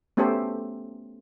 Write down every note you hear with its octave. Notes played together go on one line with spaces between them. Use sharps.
A3 B3 C#4 G4 A4 C5